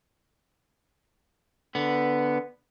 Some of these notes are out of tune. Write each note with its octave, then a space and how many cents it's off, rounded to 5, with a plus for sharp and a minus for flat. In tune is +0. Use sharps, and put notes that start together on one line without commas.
D3 +0 B3 +0